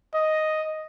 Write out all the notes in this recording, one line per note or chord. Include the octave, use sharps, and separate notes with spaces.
D#5